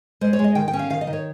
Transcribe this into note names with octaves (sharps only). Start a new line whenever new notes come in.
G#3 C5
C#5
G#3
D#5
D#3 G5
G5
C#4
F5
D#3 F5
D#5
D#3
C#5